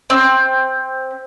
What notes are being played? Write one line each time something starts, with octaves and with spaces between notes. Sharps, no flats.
C4